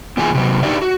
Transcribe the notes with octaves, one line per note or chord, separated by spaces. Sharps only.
E2 A#2 E3 F4 G#4 G#5
C3 F#3
D4 D#4 G4 D5 E5
F#4